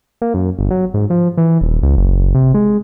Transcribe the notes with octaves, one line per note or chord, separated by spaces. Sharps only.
A#3
F#2
G1
F#3
G#2
F3
E3
D#1
C#2
F#1
C3
G#3